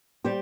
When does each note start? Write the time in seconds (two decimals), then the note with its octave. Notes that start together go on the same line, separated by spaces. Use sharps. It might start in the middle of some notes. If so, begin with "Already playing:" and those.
0.24 G3 G4 C5